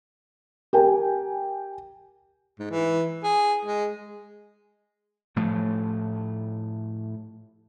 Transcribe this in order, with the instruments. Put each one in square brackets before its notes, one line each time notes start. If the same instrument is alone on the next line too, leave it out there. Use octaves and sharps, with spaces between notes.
[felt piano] G4 A#4 G5 G#5
[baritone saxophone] G#2
E3
G#4
G#3
[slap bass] A2 F3 A3